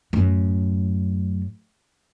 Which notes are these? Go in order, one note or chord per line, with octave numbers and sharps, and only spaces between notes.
F#2 A2